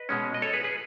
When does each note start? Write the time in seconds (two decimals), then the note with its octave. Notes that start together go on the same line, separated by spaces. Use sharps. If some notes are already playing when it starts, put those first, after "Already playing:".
Already playing: B4 D#5
0.09 B2 G#3 C#4
0.34 D#5
0.42 A4 C#5
0.53 G#4 B4
0.64 G#4 B4